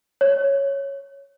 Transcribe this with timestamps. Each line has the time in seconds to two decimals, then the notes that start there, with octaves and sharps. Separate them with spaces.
0.21 C#5